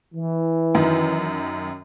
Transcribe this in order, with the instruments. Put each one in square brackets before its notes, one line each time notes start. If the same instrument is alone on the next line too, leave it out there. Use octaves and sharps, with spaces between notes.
[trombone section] E3
[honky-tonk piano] F#2 D#3